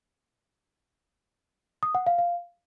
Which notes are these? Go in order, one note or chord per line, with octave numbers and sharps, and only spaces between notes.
D#6
F#5
F5
F5